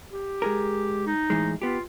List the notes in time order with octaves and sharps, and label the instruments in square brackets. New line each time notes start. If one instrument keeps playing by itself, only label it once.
[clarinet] G4
[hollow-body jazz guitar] G#3 G#4 A#4
[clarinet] D#4
[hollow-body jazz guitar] A2 E3 G#3
[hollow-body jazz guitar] B3 G4 [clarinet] F4